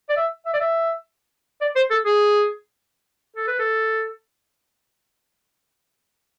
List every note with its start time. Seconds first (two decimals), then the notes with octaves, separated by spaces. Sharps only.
0.09 D5
0.17 E5
0.46 E5
0.54 D5
0.60 E5
1.61 D5
1.76 C5
1.91 A4
2.05 G#4
3.36 A4
3.47 B4
3.59 A4